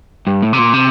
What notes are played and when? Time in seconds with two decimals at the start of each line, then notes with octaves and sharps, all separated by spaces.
0.27 G2
0.43 A2
0.53 C3
0.58 A#2
0.74 C3